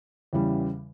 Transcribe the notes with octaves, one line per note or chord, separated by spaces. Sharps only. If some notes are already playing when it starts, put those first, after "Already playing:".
E2 C#3 E3 G3